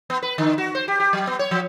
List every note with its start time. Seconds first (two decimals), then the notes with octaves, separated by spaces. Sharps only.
0.10 B3
0.23 B4
0.38 D3
0.58 F#4
0.75 C5
0.88 G4
1.00 G4
1.13 F#3
1.27 B3
1.39 C#5
1.51 F3